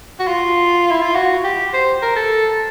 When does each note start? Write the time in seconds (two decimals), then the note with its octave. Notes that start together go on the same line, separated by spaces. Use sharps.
0.20 F#4
0.27 F4
0.91 E4
1.03 F4
1.15 F#4
1.44 G4
1.74 C5
2.02 A#4
2.16 A4